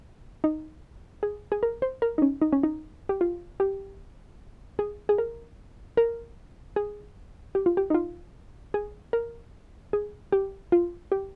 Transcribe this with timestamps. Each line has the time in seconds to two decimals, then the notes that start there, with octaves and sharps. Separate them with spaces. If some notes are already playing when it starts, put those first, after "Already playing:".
0.44 D#4
1.23 G#4
1.52 G#4
1.63 A#4
1.82 C5
2.02 A#4
2.18 D#4
2.22 C#4
2.42 D#4
2.53 C#4
2.63 D#4
3.09 G4
3.21 F4
3.60 G4
4.79 G#4
5.09 G#4
5.18 A#4
5.97 A#4
6.76 G#4
7.55 G4
7.66 F4
7.77 G4
7.90 D#4
7.94 F4
8.74 G#4
9.13 A#4
9.93 G#4
10.32 G4
10.72 F4
11.12 G4